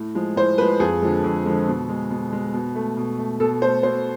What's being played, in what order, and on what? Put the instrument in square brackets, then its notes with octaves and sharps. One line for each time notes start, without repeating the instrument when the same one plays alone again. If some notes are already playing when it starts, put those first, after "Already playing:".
Already playing: [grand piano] A2
F3 G#3
A2 C5
F3 G#3 B4
F2 G#4
D3 F3 G#3
F2
D3 F3 G#3
B2
G#3
B2
G#3
B2
A3
B2
A3
B2 A4
A3 C5
B2 C5